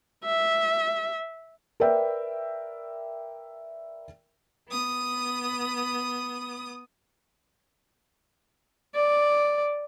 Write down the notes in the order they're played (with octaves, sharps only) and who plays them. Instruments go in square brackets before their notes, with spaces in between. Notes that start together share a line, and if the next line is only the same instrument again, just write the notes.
[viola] E5
[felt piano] A#4 B4 D5 E5 G5
[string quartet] B3 D#6
[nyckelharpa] D5